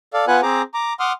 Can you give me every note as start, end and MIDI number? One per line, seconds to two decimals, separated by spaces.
0.14 0.25 69
0.14 0.25 74
0.14 0.25 77
0.27 0.41 59
0.27 0.41 65
0.27 0.41 71
0.27 0.41 78
0.27 0.41 80
0.27 0.41 90
0.42 0.62 60
0.42 0.62 68
0.42 0.62 72
0.42 0.62 82
0.42 0.62 86
0.74 0.93 82
0.74 0.93 86
1.00 1.13 78
1.00 1.13 84
1.00 1.13 86
1.00 1.13 87
1.00 1.13 89